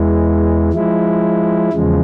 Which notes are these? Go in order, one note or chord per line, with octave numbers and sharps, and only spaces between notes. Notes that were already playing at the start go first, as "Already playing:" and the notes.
Already playing: E2 E3 G#3
F3 G#3 E4
E2 C#3 F3 G#3